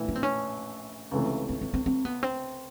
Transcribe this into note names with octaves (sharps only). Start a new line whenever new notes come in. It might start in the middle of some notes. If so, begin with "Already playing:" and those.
Already playing: A#1 A2 E3
C#4
C4
C#4
C#2 C3 E3 A3
C4
C4
C4
C4
B3
C4